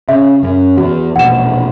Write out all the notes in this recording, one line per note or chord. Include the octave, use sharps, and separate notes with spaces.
C#3 E5
F#2
E2 F#4
E1 A#1 F#5 E7